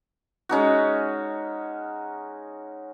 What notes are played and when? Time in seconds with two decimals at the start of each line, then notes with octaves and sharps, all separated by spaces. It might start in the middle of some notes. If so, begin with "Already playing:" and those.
0.49 G#3 C#4 D#4 F#4